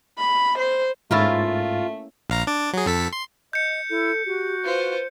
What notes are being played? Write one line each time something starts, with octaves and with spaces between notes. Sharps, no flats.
B5
C5
G#2 A3 A#3 C#4 E4 F4 A6
A#1 F5 A#5
D4 D5
F#3 G#4
F2 A4 B6
C6
D#5 G6 C#7
E4 A4
F#4 G4
F4 B4 C5